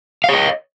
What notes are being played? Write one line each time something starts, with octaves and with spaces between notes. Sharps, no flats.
C#5 D#5 F5